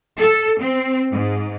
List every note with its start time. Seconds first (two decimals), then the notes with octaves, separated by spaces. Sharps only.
0.19 A4
0.60 C4
1.12 G#2